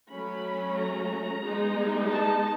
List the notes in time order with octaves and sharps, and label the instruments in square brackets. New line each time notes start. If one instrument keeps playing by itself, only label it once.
[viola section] F#3 A3 C#4 B5
A#5
G#3 B3 D#4
A5